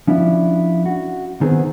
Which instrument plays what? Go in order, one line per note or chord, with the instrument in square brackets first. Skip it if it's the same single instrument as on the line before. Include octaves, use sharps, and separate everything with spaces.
[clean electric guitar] F3 C#4 D4 E4 F#4
F#4
D#3 B3 C4 G#4